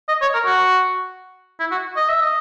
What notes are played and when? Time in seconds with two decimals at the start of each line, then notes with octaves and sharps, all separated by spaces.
0.08 D#5
0.22 C#5
0.34 A#4
0.46 F#4
1.60 E4
1.72 F#4
1.97 D#5
2.09 E5
2.22 D#5